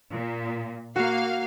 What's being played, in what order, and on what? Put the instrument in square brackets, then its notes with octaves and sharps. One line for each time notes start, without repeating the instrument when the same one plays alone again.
[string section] A#2
[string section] A#3 F5 [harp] F#4